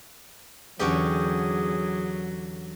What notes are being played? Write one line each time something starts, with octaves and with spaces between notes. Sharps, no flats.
E2 D3 F#3 C#4 G4 G#4